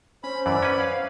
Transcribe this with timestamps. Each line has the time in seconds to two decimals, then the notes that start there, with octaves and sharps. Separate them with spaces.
0.24 C#4 C5 B5
0.46 F#2 E3 D5 B5
0.63 C#4 B4
0.80 F5